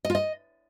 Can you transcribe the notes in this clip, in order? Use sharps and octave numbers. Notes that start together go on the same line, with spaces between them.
D#5
F4
D#5